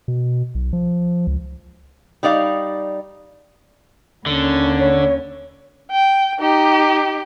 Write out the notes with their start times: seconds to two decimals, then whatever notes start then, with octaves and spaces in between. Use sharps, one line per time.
0.08 B2
0.55 B1
0.73 F3
1.27 C#2
2.23 G3 D#4 D5 F5
4.26 D#2 D3 C#4
4.79 C#5
5.91 G5
6.40 D#4 G4